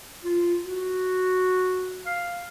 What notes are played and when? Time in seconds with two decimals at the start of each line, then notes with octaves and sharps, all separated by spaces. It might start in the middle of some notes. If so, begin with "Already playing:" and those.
0.24 F4
0.65 F#4
2.06 F5